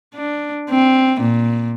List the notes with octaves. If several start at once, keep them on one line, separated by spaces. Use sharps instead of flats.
D4
C4
A#2